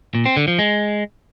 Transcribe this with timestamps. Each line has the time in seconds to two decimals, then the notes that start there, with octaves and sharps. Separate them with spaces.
0.15 A#2
0.26 C4
0.37 D3
0.48 F3
0.59 G#3